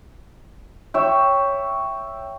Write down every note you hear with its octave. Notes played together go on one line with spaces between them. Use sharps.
C#5 E5 G5